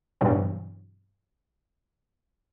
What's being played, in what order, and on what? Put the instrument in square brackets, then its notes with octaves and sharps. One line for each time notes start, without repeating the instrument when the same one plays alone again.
[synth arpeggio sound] G2 B2 E3 F#3 B3 C4